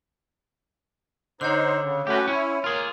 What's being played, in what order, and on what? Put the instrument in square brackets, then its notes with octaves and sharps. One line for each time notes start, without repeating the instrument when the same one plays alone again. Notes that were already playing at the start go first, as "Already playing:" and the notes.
[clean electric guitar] D3 [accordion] D#4 C5 [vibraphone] C#5 F#5 C6
[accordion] C#3
[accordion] A3 C#4 F#4 [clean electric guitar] G4 B4
[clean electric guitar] C#4 [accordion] E4
[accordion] A#3 [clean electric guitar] F4 G#4